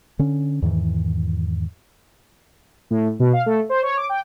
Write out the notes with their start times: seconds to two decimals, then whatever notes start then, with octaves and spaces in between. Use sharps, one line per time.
0.19 D3 C#4
0.62 E2 G#2 D#3 E3
2.90 A2
3.20 B2
3.33 F5
3.46 A3
3.69 C5
3.83 C#5
3.97 D6
4.09 G5